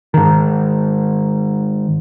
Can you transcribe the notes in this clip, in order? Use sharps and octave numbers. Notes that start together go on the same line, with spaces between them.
G#2 D#3